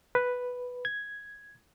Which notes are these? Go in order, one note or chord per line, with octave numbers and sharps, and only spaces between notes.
B4
G#6